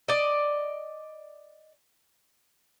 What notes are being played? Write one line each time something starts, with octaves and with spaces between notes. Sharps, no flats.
D5 D#5